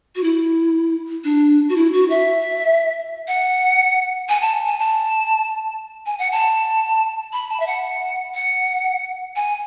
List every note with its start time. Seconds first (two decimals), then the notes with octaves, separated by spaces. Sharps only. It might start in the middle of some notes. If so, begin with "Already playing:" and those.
0.16 F#4
0.24 E4
1.24 D4
1.69 F#4
1.76 E4
1.93 F#4
2.10 E5
3.28 F#5
4.29 G#5
4.42 A5
4.67 G#5
4.79 A5
6.06 G#5
6.19 F#5
6.32 A5
7.33 B5
7.50 A5
7.60 E5
7.67 F#5
8.34 F#5
9.36 G#5